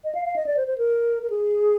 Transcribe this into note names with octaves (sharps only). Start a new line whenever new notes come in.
D#5
F5
F5
D#5
D5
C5
C5
A#4
A#4
G#4